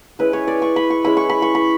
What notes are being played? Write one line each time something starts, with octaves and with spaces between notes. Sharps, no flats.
G#3 C#4 E4 B4
C#5
D5
C#6
B5
C#6
G#3 C#4 E4 B5
C#6
B5
C#6
B5